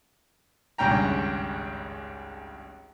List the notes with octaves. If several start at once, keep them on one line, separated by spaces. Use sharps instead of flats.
G#1 C#2 G2 C#4 G5 A#5